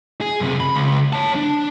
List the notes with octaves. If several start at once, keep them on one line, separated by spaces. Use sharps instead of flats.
G#4
F#2 C3
B5
C#2
C#5 A5
D4